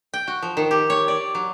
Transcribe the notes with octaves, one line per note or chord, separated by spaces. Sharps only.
G5
F#4
F3
D#3
G4
C#5
D5
F#3